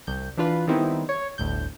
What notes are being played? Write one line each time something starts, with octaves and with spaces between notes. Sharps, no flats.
C2 G6
E3 D4 F4 B4
D#3 G3 B3 C4 D#4 E4
C#5
G1 D2 A2 G6